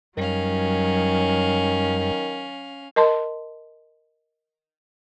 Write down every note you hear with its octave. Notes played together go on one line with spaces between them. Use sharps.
F#2 D#3 F#3 G3 C#4 F5
A#4 D#5 A5 C6